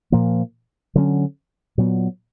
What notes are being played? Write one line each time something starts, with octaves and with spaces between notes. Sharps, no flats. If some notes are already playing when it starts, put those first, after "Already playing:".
A#2 F3 A#3
D3 F#3 A#3 C#4
A#2 F#3 B3